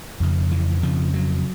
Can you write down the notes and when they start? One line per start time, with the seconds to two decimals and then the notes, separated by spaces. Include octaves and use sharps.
0.20 F2 C#3
0.51 E3
0.83 F2 C#3 F3
1.14 F#3